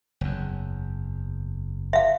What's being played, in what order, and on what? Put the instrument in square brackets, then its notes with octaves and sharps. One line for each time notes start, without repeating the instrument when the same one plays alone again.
[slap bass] F#1 E2
[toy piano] E5 F5